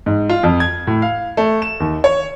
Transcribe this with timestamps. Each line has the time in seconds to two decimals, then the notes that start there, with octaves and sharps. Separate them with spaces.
0.06 G#2
0.29 F4
0.43 F2
0.60 G#6
0.87 A2
1.02 F5
1.37 A3
1.62 E7
1.80 D#2
2.04 C#5